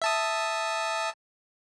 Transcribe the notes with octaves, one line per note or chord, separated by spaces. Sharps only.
E5 A5 D#6